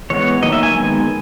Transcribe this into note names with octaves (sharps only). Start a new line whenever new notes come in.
E3 G#3 B3 C#5
D#3 F#3 A#3 D#5
E5
G#5
D#3 G#3 B3